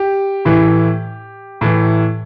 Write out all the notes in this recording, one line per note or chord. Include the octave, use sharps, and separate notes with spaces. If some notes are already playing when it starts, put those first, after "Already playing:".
Already playing: G4
A2 E3
A2 E3